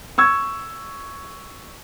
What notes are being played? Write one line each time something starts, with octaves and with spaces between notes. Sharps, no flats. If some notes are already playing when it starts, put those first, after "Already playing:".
C#6 E6 G#6